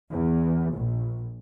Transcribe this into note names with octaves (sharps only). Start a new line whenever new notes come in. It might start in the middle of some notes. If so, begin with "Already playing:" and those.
E2
A#1